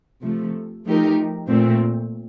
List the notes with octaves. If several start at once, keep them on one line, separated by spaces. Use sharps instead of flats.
C3 F3 A3
F3 A3 D#4 G4 A#4
A#2 A3 C4